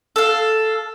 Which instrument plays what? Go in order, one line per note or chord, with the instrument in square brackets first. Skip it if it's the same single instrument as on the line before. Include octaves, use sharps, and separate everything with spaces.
[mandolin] A4 F5